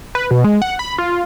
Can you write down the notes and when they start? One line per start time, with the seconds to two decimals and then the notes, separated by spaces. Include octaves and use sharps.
0.15 B4
0.31 B2
0.44 G#3
0.62 F#5
0.79 B5
0.98 F4